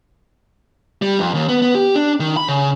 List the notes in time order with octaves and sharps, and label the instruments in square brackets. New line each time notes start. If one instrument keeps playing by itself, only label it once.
[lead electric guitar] G3
F2
D#2
B3
B3
G4
D4
D#3
B5
C#3